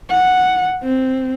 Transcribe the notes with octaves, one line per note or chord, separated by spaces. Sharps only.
F#5
C4